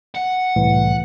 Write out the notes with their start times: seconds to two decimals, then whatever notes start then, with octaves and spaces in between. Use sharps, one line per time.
0.15 F#5
0.56 C2 A2 E3